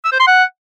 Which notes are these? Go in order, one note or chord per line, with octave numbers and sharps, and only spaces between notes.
E6
C5
C6
F#5